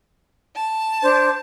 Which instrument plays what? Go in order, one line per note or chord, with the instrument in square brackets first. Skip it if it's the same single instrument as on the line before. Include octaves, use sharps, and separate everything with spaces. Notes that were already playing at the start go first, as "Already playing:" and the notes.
[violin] A5
[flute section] D4 C5